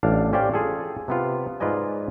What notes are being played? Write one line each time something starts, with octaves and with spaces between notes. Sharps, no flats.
A1 D4 F5
C#4 G4 C5 D5 F5 G5
F4 G#4 A4
C3 B3 F4
G#2 F4 B4 D5 D#5 G#5